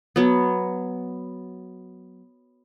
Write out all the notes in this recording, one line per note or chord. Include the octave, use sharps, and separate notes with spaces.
F#3 B3